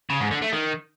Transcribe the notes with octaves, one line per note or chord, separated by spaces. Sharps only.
C#3
G#2
D3
A3
D#3